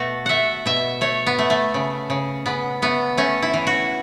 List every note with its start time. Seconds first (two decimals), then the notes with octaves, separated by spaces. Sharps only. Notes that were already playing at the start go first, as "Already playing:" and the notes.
Already playing: B2 A3 B3 F#4
0.26 A3 E5 F#5
0.66 B2 E5
1.01 A3 C#5
1.26 B3
1.38 A3
1.50 A3
1.74 C#3
2.10 C#3
2.46 C#3 B3
2.82 A3 B3
3.17 A3 C#4
3.42 E4
3.53 E3
3.67 F#4